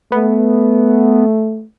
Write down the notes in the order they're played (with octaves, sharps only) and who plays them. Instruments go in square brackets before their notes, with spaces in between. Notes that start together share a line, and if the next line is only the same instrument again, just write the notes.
[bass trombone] A3 [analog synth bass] B3